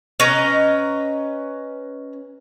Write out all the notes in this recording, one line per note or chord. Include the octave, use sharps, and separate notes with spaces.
C#4 B4 D#5 A#5